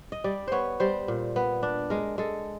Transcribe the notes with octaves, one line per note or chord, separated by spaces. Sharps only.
D#5
G3 D5
B3 C5 C#5
G3 C5
A#2
B3
D4
G#3 A#4
G#3 A4